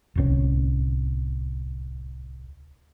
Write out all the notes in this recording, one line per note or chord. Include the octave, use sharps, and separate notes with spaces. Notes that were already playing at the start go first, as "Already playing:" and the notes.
D1 C2 C#4